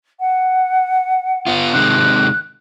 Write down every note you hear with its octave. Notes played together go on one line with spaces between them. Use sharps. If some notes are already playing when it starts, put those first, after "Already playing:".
F#5
B3 F4
C3 D#3 G#3 F#6